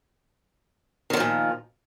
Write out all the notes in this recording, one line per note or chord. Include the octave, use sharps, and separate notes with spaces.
A#2 D3 D#3 F3